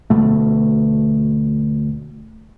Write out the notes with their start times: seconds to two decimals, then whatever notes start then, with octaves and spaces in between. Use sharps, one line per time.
0.10 D2 B2 A3